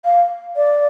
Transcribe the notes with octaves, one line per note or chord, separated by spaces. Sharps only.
F5
D5